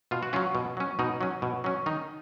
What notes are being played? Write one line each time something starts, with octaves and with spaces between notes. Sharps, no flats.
B2 F4
F#4
F#3 C#4 F4
B2
F#3 C#4
B2 D#4
F#3 C#4
B2
F#3 C#4
D#3 D#4